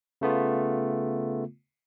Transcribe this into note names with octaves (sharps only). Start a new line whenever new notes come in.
C#3 A3 B3 F4